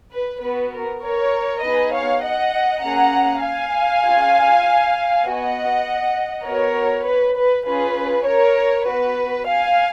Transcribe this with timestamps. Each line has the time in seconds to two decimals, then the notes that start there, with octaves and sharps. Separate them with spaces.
0.12 B4
0.41 B3 F#4 B4
0.72 A#4
1.02 A#4 C#5
1.62 B3 D#4 G#4 B4 D#5
1.92 C#5 F5
2.23 D#5 F#5
2.83 A#3 C#4 G#4 F#5 A#5
3.43 F5 G#5
4.04 C#4 F4 G#4
5.24 B3 F#4 D#5 F#5
6.45 B3 F#4 A#4 C#5
7.06 B4
7.35 B4
7.66 C#4 F4 G#4 B4
8.26 A#4 C#5
8.86 B3 F#4 B4
9.47 F5 G#5